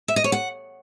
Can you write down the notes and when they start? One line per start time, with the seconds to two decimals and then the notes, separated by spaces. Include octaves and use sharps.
0.08 E5
0.16 D#5
0.24 C#5
0.32 F#5